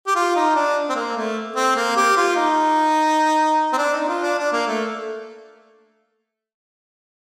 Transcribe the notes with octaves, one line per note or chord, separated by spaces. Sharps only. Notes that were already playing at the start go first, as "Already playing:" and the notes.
G4
F4
D#4
D4
C4
A#3
A3
C4
A#3
G4
F4
D#4
C4
D4
D#4
F4
D4
D4
A#3
A3